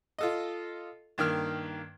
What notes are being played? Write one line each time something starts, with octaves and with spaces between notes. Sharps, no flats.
F4 A4 D#5
G2 D#3 A#3 F6